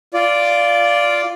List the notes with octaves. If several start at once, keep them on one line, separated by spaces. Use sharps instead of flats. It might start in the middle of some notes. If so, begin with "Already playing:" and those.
F4 D5